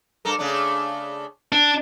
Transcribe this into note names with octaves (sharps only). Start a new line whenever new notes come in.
G2 A4 A#4
C#3 A3 D4
D4